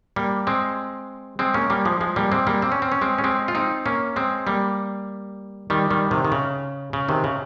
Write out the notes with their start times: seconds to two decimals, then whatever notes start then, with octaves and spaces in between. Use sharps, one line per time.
0.16 G3 A#3
0.47 G#3 C4
1.39 G#3 C4
1.54 A#3 C#4
1.70 G3 A#3
1.85 F3 G#3
2.01 F3 G#3
2.16 G3 A#3
2.32 G#3 C4
2.47 G3 A#3
2.62 C4
2.72 C#4
2.82 C4
2.92 C#4
3.01 G#3 C4
3.18 C#4
3.24 G#3 C4
3.48 F4
3.55 C4 D#4
3.86 A#3 C#4
4.16 G#3 C4
4.47 G3 A#3
5.70 D#3 G3
5.90 D#3 G3
6.11 C3 D#3
6.25 D#3
6.32 C#3
6.93 C#3
7.09 C3 D#3
7.24 C#3